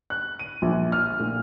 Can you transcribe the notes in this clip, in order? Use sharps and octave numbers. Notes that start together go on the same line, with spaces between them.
F#6
D#7
A#1
F6
A#2